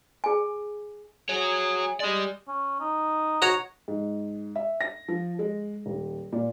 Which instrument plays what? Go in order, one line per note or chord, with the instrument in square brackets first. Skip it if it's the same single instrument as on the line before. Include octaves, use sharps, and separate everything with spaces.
[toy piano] G#4 G#5
[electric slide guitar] F#4 C#5 [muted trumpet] G#4
[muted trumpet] G#3 [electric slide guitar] G4 D5
[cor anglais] C#4
D#4
[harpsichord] F#4 C#5 A#5
[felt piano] G#2
E5
A#6
F3
G#3
D#1
A#2